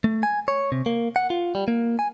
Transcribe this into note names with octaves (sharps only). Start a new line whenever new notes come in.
A3
G#5
C#5
C3
A#3
F#5
F4
G3
A#3
G#5